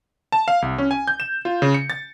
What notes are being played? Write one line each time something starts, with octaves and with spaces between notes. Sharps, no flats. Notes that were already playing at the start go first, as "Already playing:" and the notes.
A5
F5
C2
C#4
G#5
G6
E7
F4
C#3
C#7
A6